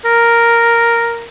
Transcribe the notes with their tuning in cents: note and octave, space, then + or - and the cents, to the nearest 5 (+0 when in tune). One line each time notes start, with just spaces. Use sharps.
A#4 +0